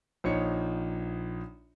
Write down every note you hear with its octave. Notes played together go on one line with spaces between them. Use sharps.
A#1 F3 D#4 C#5 C#7